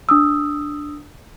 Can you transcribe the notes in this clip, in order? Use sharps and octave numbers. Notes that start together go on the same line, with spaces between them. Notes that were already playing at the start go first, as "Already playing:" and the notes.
D4 D#6 E6